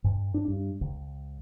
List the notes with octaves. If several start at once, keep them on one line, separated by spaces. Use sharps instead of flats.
G2
D4
G2
C#2